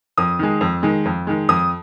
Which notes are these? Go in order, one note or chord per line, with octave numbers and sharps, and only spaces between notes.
F2 D#6
D#3 G#3
F2
D#3 G#3
F2
D#3 G#3
F2 D#6